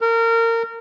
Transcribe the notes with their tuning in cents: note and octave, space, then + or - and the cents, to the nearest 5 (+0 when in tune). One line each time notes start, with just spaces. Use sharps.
A#4 -25